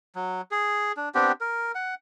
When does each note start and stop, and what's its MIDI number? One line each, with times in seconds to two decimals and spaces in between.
0.15 0.41 54
0.51 0.92 68
0.97 1.09 62
1.15 1.32 59
1.15 1.32 60
1.15 1.32 62
1.15 1.32 67
1.41 1.72 70
1.75 1.95 78